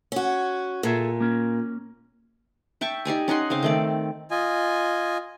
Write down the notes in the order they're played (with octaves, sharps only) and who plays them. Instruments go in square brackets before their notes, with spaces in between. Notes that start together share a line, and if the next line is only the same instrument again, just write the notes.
[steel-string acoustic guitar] C#4 F#4
[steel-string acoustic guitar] A#2 [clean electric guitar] G#4 A4 E5
[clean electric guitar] A#3 C#4
[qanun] E5 G5 A5 C#6
D#4 G4 D5 G#5
C#4 D#4 F#5 C6
C#3 C4 F5
D#3 A3 D5
[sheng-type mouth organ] F4 D#5 G#5